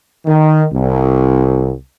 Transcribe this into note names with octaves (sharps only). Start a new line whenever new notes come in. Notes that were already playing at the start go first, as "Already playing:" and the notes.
D#3
C2